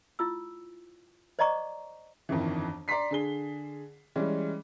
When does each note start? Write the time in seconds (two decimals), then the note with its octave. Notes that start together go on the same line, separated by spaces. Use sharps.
0.19 E4 F4 E6
1.39 C5 D5 D#5 A#5 C#6 D6
2.29 G1 F2 D#3 E3
2.88 D5 A#5 C6 B6 C7
3.11 D3 G#4 G7
4.16 E3 G3 G#3 C#4